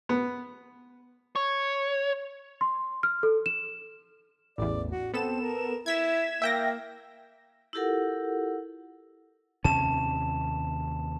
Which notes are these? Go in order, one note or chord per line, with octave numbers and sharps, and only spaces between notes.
B3
C#5
C6
F6
A4
E7
A1 E2 D5
F#4
B3 C4 A4 E7
A#4
E4 G#6 B6 E7
A#3 E5 G5 A#6
E4 F4 G4 A4 A#4 F#5
D#2 C3 C#4 A5 E7